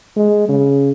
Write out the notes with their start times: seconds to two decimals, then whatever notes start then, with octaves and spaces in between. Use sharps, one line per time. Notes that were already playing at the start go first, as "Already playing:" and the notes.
0.16 G#3
0.48 C#3